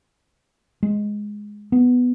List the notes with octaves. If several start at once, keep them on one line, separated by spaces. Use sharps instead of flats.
G#3
B3